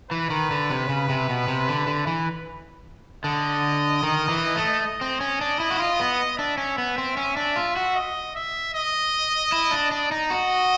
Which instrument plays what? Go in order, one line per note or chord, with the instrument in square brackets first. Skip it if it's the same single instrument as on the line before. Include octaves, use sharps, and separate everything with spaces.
[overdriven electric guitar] E3 [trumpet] B4
[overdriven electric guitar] D#3
D3
C3
C#3
C3
B2
C3
D3
D3
E3
[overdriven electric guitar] D3 [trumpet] D#5
[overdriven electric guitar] D#3
E3
A3
[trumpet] D#5
[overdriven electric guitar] C4
C#4
D4
E4
F#4
F4
B3
[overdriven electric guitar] D4 [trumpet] E5
[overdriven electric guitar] C#4
B3
C4
C#4
D4
F4
F#4
[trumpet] D#5
E5
D#5
[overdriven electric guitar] E4
D4
D4
D#4
[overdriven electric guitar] F#4 [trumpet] D#5